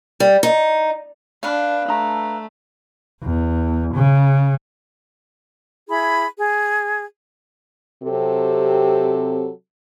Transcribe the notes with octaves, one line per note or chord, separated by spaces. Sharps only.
G3
D#4
D4 B4 F5
A3 D4 A#5
E2
C#3
E4 G#4 B5
G#4
C3 F#3 C4 G4 A4